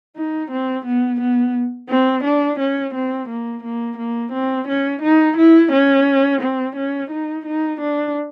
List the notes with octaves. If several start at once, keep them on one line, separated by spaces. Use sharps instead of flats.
D#4
C4
B3
B3
C4
D4
C#4
C4
A#3
A#3
A#3
C4
C#4
D#4
E4
C#4
C4
C#4
D#4
D#4
D4